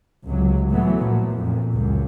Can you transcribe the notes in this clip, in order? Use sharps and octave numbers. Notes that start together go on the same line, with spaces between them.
C#2 C3 F#3
A2 E3 F#3 A3 B3
A#2 F3
F2 A#2
C#2 F#2